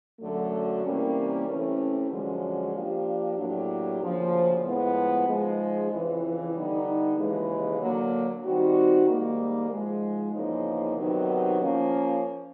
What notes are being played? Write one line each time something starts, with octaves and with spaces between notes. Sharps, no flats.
F#2 D3 F#3 A3
C3 E3 G3 A#3 C#4
C3 E3 A3 C#4
F#2 D3 F3 G#3 C#4
F3 A#3 D4 G4
A2 F#3 A#3 D4 G4
D2 C#3 F3 A#3
A2 F3 G#3 B3
G#2 F3 G#3
F2 C#3 E3
D3 G3 B3 D#4
D#2 C#3 E3 G#3
D3 F#3 A#3
D#3 G3 C4 D#4 F#4
G#2 D#3 G3 A#3
G#2 F3 G#3
E2 C#3 F3 A#3 D#4
C3 D#3 F#3 B3 D#4
F3 A#3 C#4